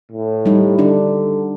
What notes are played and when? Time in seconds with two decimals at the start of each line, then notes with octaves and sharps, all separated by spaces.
0.12 A2
0.46 G3 D#4
0.79 D3 D4